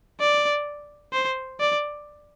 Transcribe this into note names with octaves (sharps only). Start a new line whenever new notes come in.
D5
C5
D5